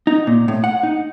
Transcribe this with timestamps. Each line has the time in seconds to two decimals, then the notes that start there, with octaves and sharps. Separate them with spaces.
0.07 D#4
0.27 A#2
0.48 A2
0.64 F#5
0.83 D#4